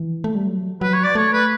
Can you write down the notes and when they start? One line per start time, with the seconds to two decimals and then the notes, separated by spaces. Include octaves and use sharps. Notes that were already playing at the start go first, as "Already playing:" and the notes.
Already playing: E3
0.24 A3
0.35 G3
0.47 F#3
0.81 F#3 B4
0.93 C#5
1.04 D5
1.15 A3 C#5
1.33 B4